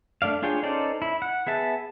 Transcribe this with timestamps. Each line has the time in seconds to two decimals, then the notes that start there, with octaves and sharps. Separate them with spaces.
0.22 A3 D4 D5 F5
0.42 D4 F4 G#4 C#5 G5
0.63 C#4 D#4 A4 C5 D5
1.02 E4
1.22 F#5
1.47 B3 G#4 E5 A5